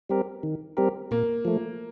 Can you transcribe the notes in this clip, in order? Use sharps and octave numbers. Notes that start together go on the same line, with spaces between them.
G3 C4 G4 A#4
D#3
G3 C4 G4 A#4
A#2 A#3
F3 A3